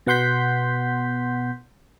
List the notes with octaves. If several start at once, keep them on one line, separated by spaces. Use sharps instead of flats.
B2 B3 F#5 C6 G6 B6